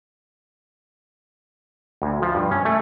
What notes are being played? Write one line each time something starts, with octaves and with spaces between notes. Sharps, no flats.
D2
F3
G2
C#4
A3